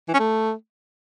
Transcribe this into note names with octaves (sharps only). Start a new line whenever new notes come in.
E3
C#4
A3